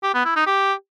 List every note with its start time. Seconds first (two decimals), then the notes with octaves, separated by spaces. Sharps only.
0.03 G4
0.14 B3
0.25 E4
0.36 D#4
0.47 G4